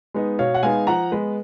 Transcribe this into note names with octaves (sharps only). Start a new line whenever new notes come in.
G#3 B3 D#4
B2 C#5 F5
F#5
G#3 B3 D#4 F5 G#5
F3 F#5 A#5
G#3 B3 B4